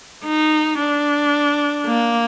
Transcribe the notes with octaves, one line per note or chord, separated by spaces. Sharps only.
D#4
D4
A#3